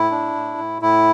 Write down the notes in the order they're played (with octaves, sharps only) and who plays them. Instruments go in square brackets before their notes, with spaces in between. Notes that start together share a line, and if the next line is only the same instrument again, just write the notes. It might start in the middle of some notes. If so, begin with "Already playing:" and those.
Already playing: [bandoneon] A2 E4
D4
A2
A2
A2 E4